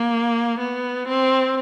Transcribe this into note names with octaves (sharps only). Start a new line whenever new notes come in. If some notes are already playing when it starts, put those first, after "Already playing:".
Already playing: A#3
B3
C4